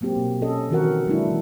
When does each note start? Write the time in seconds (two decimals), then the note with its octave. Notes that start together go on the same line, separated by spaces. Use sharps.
0.01 F#3 A#3 C4 G4
0.16 B2
0.42 C#4 A4 D#5
0.70 D#3 E3 C4 F#4 A#4 F#5
1.06 F#3 G#3 A#3 D4 E4
1.27 E3